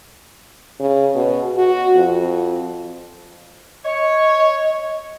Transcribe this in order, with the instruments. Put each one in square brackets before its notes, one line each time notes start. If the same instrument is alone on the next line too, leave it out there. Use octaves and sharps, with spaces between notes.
[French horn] C#3
B2
F#4
F2
[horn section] C#5 [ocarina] D#5